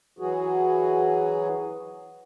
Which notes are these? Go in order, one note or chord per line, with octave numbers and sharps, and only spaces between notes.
E3 F#3 F#4 G#4